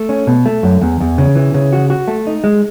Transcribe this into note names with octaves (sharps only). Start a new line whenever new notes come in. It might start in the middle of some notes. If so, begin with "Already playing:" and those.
Already playing: A3
C#4
B2
A3
F#2
E2
E2
C#3
E3
C#3
F#4
F#4
A3
D#4
G#3